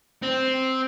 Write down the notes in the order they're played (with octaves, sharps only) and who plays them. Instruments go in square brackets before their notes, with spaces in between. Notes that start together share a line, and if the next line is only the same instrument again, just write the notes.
[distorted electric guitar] C4